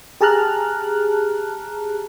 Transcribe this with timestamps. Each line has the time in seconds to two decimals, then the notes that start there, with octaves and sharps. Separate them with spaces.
0.21 G4 G#4 A5 A#5 F6 F#6